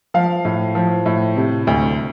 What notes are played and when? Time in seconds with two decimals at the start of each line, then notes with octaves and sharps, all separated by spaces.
0.14 F3 F5
0.45 A2
0.75 F3
1.06 A2
1.36 C3
1.67 D2